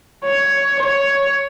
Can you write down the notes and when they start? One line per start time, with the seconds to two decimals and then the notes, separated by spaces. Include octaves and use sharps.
0.24 C#5
0.79 C#5